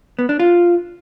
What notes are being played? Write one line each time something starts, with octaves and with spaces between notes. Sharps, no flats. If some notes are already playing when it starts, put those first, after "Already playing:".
B3
D4
F4